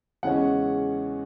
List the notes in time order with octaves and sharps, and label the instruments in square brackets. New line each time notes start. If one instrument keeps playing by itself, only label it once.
[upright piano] E2 C#3 G#3 C#4 F#5